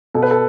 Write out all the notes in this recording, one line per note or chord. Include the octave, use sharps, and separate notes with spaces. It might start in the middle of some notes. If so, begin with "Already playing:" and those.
B2 A4
B4
A4